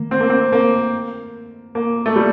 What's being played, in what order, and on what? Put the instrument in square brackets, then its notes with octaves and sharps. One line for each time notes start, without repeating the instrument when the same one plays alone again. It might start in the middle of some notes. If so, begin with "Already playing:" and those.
Already playing: [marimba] D#3 A3 [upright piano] A#3
[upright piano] C4
A#3
C4
A#3
A#3
A3
G3